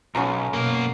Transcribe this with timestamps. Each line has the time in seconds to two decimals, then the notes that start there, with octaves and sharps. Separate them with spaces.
0.15 B1 C#4 F#4 A#5
0.53 F#2 B2 A#3